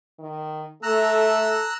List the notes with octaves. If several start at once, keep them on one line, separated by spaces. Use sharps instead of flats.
D#3
A3 A4 A#5 E6 F#6